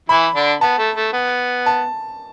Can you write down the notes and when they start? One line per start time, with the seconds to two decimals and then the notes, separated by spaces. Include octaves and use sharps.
0.09 E3 E4 B5
0.35 D3 D4
0.61 B3 A5
0.78 A3
0.96 A3
1.13 B3
1.66 A5